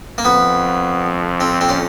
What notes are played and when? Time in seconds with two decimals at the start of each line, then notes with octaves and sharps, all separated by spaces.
0.18 A#3
0.25 F2 B3
1.40 C4
1.61 C4
1.69 C#4